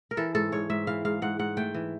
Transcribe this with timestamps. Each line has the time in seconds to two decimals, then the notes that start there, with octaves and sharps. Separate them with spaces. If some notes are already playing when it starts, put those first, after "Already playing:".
0.11 A#4
0.17 E3 A4
0.34 G#2 A4
0.52 G#2 C#5
0.70 G#2 E5
0.87 E3 F5
1.05 G#2 F5
1.22 G#2 F#5
1.39 G#2 F#5
1.57 A3 G5
1.75 E3